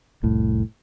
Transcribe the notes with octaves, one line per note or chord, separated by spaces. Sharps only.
F1 C2 A2